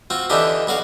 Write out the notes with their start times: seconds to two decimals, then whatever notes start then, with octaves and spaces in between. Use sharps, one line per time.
0.10 C4 F4 F#4
0.30 D3 E3 D4 D#4 F4 G4
0.67 B1 F#4 D5 F5